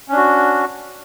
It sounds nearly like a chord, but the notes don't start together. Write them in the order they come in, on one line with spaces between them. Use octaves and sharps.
C#4 D4 F#4